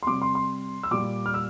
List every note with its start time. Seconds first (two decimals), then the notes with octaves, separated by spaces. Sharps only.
0.03 C6
0.06 C3 G3 D6
0.22 C6
0.35 C6
0.83 E6
0.91 A#2 G3 D6
1.26 F6
1.34 E6